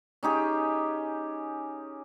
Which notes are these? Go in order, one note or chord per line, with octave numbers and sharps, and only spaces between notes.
C#4 D#4 G4 G#4